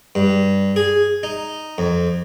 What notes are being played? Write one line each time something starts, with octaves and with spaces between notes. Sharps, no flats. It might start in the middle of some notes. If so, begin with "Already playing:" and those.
G2
G#4
D#4
F2